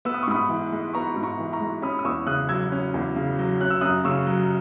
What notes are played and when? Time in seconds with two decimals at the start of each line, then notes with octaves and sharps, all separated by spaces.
0.05 B3 E6
0.14 D#6
0.23 C#6
0.27 G#2 B5 D#6
0.49 E3
0.72 G#3
0.94 B3 A#5 C#6
1.16 G#2
1.23 A#5 C#6
1.39 E3
1.53 A#5 C#6
1.61 G#3
1.82 C#4 B5 D#6
1.99 D#6
2.04 E2 C#6 E6
2.27 C#3 D#6 F#6
2.49 F#3 E6 G#6
2.72 C#4
2.94 E2
3.16 C#3
3.39 F#3
3.60 C#4 F#6
3.70 E6
3.81 F#2 D#6 F#6
4.05 C#3 C#6 E6
4.26 F#3